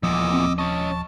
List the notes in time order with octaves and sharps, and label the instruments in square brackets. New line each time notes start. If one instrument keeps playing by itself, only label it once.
[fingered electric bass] D#1 F3 [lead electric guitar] E2 A#2 [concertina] D#5 D6 E6
[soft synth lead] C4
[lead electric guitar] C#4 D#5 [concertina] A5 [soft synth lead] C#6